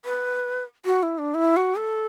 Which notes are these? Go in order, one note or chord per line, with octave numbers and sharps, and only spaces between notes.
B4
F#4
E4
D4
E4
F#4
A4